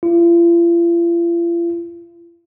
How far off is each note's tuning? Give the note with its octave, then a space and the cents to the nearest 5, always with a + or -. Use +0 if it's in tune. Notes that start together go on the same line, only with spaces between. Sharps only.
F4 -45